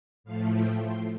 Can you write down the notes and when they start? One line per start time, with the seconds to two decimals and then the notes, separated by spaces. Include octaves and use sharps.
0.24 A2 F3 A3 F5
0.54 G5
0.82 C6